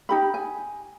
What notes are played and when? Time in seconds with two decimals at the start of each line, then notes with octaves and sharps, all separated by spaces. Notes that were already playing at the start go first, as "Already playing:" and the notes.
0.09 D#4 G4 B5
0.34 G#5